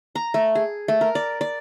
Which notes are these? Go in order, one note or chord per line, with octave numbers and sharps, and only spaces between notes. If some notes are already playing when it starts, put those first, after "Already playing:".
A#5
A3
G#4
A3
A#4
D5
D5